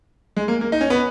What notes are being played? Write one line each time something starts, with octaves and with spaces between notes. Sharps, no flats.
G#3
A#3
A#3
D#4
C#4
B3